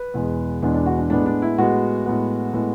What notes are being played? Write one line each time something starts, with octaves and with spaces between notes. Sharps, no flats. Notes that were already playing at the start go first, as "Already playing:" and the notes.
Already playing: B4
E2 B2 G#3 B3
E2 B2 G#3 B3 D4
D4
F#4
D4
A2 G#3 B3 D4
D4
E4
A2 G#3 B3 F#4
A2 G#3 B3
A2 G#3 B3